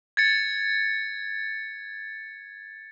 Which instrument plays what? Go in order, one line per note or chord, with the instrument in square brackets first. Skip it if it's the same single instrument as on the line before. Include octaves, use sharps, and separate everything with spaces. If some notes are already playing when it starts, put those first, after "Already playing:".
[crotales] G#6 A6 C#7